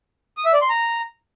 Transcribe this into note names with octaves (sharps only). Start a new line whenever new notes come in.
D#6
E5
D5
C6
A#5